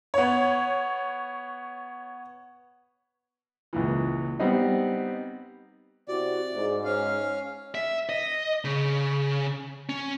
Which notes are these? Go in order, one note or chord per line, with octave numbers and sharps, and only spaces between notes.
B3 C#5
C#2 A#2 E3
G3 B3 C4 D#4
C3 E4 F#4 D5
G#2
C#4 F5
E5
D#5
C#3
C#4